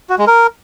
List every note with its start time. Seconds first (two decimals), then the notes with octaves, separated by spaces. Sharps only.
0.10 F#4
0.18 G#3
0.27 A#4